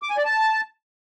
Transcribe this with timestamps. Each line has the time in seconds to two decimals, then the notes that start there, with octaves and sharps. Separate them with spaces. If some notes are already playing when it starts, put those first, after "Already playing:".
0.02 D6
0.10 G#5
0.17 D5
0.25 A5